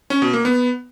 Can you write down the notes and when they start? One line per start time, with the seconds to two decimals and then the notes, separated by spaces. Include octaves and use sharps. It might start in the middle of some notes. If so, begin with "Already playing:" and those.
0.10 C#4
0.22 B2
0.33 A#3
0.45 B3